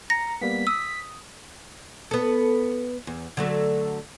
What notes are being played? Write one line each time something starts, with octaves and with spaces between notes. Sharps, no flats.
A#5 A#6 C#7
G3 A#3 B3 B6
D#6 E6
B3 A4
E2
D3 F#3 A3